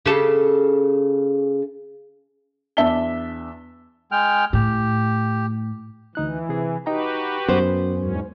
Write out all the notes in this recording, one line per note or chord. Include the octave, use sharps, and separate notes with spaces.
C#3 G4 A4
E2 D4 E5 A5 B6 G7
G#3 G5 F6
A2 G4
D2 E3 D#4 F#6
C3 G#4
D#4 F#4 G4 B4 G5 A#5
F#2 B3 C5
E2 G#2 C#4